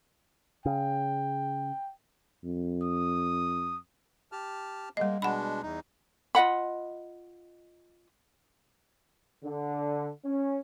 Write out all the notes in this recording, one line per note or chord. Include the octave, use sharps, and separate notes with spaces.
C#3 G5
F2
D#6
G4 A5 F6
G3 G#3 A#3 D#5
B2 G#3 D4 F#5 B5
E2 D#4
F4 D#5 F#5 B5
D3
C#4